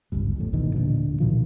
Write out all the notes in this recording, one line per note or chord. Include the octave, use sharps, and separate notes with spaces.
D1 G#1 C#2 G2
A1 F2 A2
G#1 E2 B2 D#3
D#1 A#2 D3 F3
C#2 B2 D#3 F3